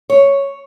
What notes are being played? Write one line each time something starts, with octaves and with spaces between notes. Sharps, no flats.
C#5